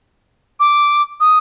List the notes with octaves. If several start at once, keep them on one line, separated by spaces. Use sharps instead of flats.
D6
D#6